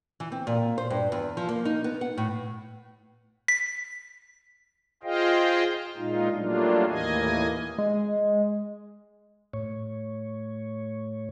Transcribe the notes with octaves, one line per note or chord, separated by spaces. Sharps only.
E3
C4
A#2
C5
G2
E2
F3
A#3
D#4
B3
F#5
A2
B6
F4 G#4 C5 D#5 F5 G5
A#2 G#3 D#4 F4
F#3 G3 A3 A#3 D4 F4
D#2 A2 E3 A#3 D#5 G#5
G#3
A2 C#5